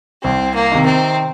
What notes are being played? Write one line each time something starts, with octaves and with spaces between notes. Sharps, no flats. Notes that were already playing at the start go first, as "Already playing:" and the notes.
C2 C4
A#3
C3 D#3
C4